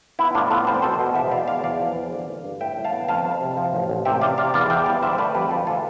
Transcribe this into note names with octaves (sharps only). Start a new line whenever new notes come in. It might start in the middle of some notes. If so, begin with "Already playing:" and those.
B3 E4
A2 D4 F4
B3 F4 A4
C4 C5
D5
B2 A4 C5
B2
E2 C5 E5
B2 D5 F5
E2 D5 F5
E2 D5 F5
F3
E2
D3
D3
G2
A2 E5 G5
A2
F5 A5
B3
F2 F5 A5
F2
C3
F3
A1
A1
C3 E5 G5
C3 D5 F5
C3 D5 F5
E2 D5 F5
E2 E5 G5
G3 D5 F5
D3 C5 E5
A3 B4 D5
F2 G4 B4
D2 F4 A4
E3 F4 A4